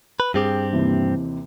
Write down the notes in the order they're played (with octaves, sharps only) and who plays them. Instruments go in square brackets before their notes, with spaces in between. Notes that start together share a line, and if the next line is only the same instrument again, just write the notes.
[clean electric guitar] B4
[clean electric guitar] G2 C4 G4 [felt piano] G#4
[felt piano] D#2 C3 E3